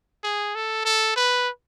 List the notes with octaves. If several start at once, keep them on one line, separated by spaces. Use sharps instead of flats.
G#4
A4
A4
B4